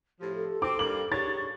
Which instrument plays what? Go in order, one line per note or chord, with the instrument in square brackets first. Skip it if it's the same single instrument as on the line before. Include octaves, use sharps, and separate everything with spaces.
[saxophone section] A2 C3 F3 [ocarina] G4
[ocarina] G4 [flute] A4
[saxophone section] C4 [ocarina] F#4 [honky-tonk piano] D6
[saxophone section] G3 A#3 [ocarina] D4 [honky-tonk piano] F#7
[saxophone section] D4 G#4 C#5 [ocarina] G4 [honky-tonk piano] A6